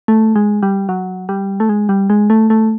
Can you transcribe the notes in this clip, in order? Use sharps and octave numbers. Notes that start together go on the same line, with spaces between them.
A3
G#3
G3
F#3
G3
A3
G#3
G3
G#3
A3
A3